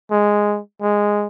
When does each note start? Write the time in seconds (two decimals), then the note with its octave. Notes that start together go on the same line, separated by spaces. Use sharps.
0.11 G#3
0.82 G#3